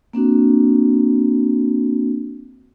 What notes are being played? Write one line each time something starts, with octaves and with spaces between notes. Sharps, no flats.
A#3 C4 D4 F#4